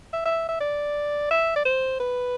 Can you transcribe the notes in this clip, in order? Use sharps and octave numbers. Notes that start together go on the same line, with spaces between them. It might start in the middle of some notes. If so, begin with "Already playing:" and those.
E5
E5
E5
D5
E5
D5
C5
B4